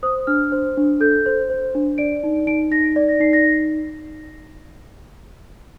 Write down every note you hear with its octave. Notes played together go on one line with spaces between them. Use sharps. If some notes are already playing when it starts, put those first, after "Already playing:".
C5 D#6
D4 F6
C5
D4
A4 G6
C5
C5
D4
D5 D7
D#4
D#4 D7
D#4 A#6
D5
A#6
D#4 C7
A#6